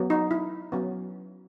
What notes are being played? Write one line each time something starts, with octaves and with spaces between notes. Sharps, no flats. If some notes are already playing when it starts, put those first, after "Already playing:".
Already playing: F#3 B3
D#4
E4
F#3 B3 C#4